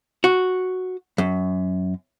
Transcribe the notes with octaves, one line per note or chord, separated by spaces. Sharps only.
F#4
F#2